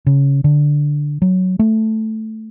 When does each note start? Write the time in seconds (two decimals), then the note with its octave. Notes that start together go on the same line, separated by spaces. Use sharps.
0.07 C#3
0.44 D3
1.22 F#3
1.59 A3